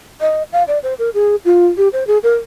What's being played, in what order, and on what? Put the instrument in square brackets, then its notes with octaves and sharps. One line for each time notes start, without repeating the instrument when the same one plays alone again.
[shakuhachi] D#5
F5
D5
C5
A#4
G#4
F4
G4
C5
G#4
A#4